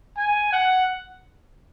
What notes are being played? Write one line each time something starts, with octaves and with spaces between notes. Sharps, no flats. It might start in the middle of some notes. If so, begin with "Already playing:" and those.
G#5
F#5